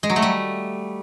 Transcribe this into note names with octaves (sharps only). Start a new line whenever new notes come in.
G#3
F#3
A3
G3